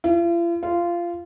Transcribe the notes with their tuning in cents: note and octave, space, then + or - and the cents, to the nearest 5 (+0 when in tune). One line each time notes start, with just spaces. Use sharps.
F4 -45
F4 -15